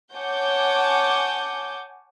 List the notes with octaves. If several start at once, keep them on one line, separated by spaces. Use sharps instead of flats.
C#5 F#5 G#5 A5 D6 G6